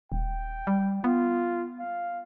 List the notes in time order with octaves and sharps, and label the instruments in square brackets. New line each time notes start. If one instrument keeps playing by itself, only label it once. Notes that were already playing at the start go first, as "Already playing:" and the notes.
[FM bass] D#1 [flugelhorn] G5
[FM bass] G3
[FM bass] B3 [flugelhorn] F4
[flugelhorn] F5